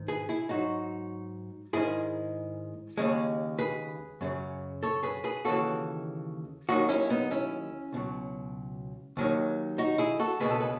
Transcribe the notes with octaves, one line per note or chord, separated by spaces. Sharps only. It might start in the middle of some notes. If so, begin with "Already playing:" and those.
Already playing: G#2 D#3
G#4 B4
E4 G#4
G#2 F#3 D#4 F#4
G#2 D#3 G#3 E4 G#4
D#2 C#3 G#3
G#4 B4
F#2 C#3 F#3
A4 C#5
G#4 B4
G#4 B4
D#2 C#3 E3 F#4 A4
D#2 D#3 F#3 D#4 F#4
C#4 E4
B3 D#4
C#4 E4
C#2 B2 F#3
D#2 D#3 F#3
D#4 F#4
E4 G#4
F#4 A4
C#2 B2 G#3 G#4 B4
A4
B4